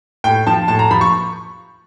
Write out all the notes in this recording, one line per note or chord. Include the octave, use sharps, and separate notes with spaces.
A2 G5
F3 A5
A2 A5
A#5
F3 B5
C#6